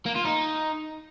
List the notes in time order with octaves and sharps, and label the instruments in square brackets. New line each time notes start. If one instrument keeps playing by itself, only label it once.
[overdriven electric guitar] A#3
F4
D#4